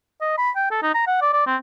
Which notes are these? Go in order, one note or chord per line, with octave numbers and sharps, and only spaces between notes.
D#5
B5
G5
A4
D#4
A#5
F#5
D5
D5
C4